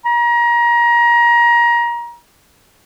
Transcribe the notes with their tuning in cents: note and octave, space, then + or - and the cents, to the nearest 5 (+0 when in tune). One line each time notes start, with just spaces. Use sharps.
A#5 +25